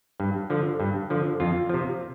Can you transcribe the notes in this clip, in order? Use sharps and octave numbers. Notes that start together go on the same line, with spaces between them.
G2
D3 F3
G2
D3 F3
F2 F4
C3 F3